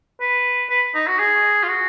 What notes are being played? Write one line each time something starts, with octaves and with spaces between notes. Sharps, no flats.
B4
B4
D#4
F#4
G#4
F4
F#4